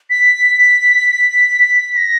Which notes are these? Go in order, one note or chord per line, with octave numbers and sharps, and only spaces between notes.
B6
A#6